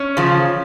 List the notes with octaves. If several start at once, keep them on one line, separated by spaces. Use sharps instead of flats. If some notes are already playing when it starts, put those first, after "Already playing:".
Already playing: C#4
C#3 F3